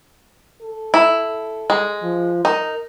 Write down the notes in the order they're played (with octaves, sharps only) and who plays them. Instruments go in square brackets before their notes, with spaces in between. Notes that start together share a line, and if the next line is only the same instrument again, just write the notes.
[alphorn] A4
[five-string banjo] E4
G#3
[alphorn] F3
[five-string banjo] D#4 [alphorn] A#4